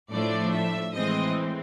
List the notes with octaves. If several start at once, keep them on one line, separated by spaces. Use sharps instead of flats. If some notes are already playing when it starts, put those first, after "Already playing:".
A2 F3 A3 D4 D5
E5
A2 E3 G#3 C4 D#5